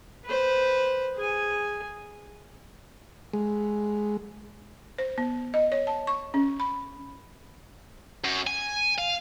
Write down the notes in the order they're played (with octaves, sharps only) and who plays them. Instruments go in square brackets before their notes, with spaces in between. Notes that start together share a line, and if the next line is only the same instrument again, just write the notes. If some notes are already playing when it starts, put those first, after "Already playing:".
[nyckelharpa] B4 C5
G#4 G#5
[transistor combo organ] G#3
[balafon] C5
B3
D#5
C#5
A5
C#6
C#4
B5
[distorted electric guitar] F#2
G#5
F5